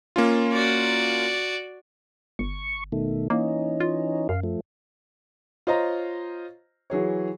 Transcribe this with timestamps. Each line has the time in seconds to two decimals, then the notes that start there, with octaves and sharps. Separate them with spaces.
0.16 A#3 C#4 F4
0.53 F#4 D5
2.39 G1 C#6
2.92 B2 D#3 A3
3.30 E3 A#3 C#4 D#4
3.80 F4
4.29 F#2 F5
4.43 F3 A3
5.67 F4 C5 C#5 D#5 F5 A#5
6.90 E3 F#3 G#4 C#5